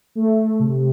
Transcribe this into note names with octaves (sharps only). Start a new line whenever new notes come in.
A3
A3
C3